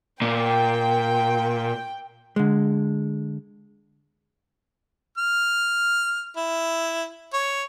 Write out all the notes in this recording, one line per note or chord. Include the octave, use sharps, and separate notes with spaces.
A#2 G5
D3 G#3
F6
E4
C#5